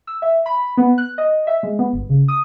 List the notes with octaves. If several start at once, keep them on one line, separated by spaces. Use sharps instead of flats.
E6
E5
B5
B3
F#6
D#5
E5
G#3
B3
G1
C#3
D#6